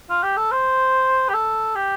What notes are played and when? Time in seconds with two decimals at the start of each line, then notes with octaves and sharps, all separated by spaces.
0.10 F4
0.23 G4
0.37 A4
0.52 C5
1.29 G4
1.34 A4
1.75 G4